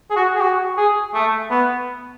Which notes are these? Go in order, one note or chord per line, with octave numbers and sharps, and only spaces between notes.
G#4
F#4
G#4
F#4
G#4
A3
B3